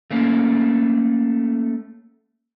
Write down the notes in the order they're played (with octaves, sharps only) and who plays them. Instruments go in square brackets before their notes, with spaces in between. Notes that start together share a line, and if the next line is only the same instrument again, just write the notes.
[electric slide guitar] A3 A#3 C#4